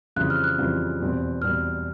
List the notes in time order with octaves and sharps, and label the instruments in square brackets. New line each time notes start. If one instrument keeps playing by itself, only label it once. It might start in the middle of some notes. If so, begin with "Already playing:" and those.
[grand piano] F2 C#3 E3 G3 C4 [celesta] F#6
[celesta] F6
F#6
[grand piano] F2 C#3 E3 G3 C4
E2 B2 G3 C4
[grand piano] E2 B2 G3 C4 [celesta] F6